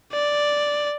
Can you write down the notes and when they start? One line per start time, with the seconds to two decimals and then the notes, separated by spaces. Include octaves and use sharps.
0.12 D5